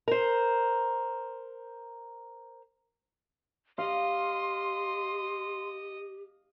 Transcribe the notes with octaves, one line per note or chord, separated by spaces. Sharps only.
A#4 C5
G4 D#5 F5 C6